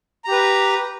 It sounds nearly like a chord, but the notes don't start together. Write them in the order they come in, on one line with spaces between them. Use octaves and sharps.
A#5 G4 B4